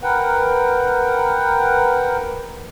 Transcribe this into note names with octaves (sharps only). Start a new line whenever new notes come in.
A#4 B4 F#5 G5